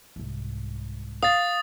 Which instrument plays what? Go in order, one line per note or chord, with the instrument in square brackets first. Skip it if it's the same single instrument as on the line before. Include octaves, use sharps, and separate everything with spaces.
[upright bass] C2 G#2
[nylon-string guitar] F5 [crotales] D#6 A6